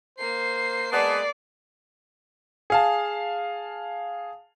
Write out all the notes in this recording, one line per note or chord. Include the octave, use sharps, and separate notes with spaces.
A#3 C5 C7
G#3 B3 D5 A5
G#4 F5 A5